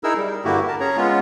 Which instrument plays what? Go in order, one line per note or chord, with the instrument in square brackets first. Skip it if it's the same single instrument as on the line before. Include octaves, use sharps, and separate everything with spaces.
[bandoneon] D#4 E4 G#4 A#4 E6
G3
G2 D3 A#3 E4 F#4 G4
A#4 A5
C#4 G#4 C#5 A#5
G#3 B3 C#4 F4